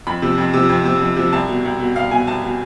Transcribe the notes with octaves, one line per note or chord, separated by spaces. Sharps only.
F2 B5
C3 F3
F2
C3 F3
F2
C3 F3
F2
C3 F3
C2 A5
B2
C2
B2
C2 F5
B2 G#5
C2 A5
B2